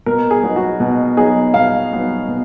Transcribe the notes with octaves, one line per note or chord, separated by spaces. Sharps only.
B2 A#4
G#4
F#3 B3 D#4
F#4
B2
F#3 B3 D#4 G#4
B2 F5
F#3 B3 D#4
B2